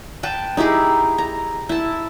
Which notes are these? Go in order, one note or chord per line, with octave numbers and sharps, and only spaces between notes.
B4 G5 A5
D#4 E4 G4 G#4
A#5
E4 A5